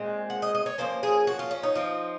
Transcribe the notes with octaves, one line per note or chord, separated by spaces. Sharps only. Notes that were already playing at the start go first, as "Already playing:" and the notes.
Already playing: A#2 G#3 C4
F#5
D#5
D#5
C#5
F3 A#3 C#4 C5
G#4
F#4
F4
C#4
D#4
F3 C4